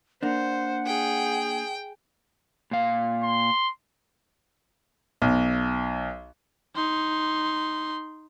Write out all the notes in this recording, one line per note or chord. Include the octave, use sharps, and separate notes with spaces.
A#3 D4 C5 F#5
G#4 G5
A#2 F5
C6
B1
D#4 C6